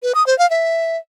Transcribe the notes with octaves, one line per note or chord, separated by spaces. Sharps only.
B4
D#6
C5
F5
E5